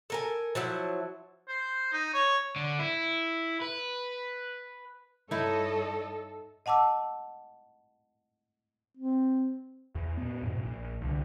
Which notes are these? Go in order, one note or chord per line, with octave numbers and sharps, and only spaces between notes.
A4 A#4 G#5
F3 F#3 E4
C5
D#4
C#5
D3
E4
B4
G2 D#4 E4 A4 C#5 D#5
D#5 F#5 A5 D6 E6
C4
E2
A#2 B3
F2 G#2 B2
A#1 A#2
C2 D3